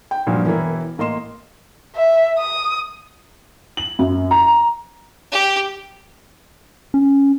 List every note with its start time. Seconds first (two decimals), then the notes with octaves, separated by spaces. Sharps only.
0.11 G5
0.26 G2 A#2 F3 F#3
0.45 E1 E3 E4 A#4
0.98 A1 A#3 D#5 C6 E7
1.96 E5
2.38 D#6
3.77 F#7
3.99 F#2
4.31 A#5
5.32 G4
6.94 C#4